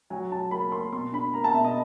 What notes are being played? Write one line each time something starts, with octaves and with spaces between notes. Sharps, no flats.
F#3 G#5
F#3 A5
A#3 B5
A#3 C6
B2 C6
D4 B5
A#3 A#5
A5
B2 E5
D#5